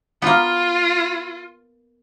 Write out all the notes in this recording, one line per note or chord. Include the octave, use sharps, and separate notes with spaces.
A#3 B3 F4